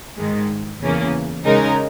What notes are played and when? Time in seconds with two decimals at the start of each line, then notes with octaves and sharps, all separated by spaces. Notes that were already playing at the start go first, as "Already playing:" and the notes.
0.17 G#2 D#3 G#3
0.81 E2 C#3 E3 A#3 C#4
1.45 C#3 G#3 D#4 A#4